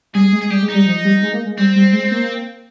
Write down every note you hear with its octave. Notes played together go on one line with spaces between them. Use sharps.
G3 G#4
G#3
G#4
G3 G4
G#3
D#4
G3
F3
G3
G#3
A#3
G#3
G3 C4
G3
G#3
A#3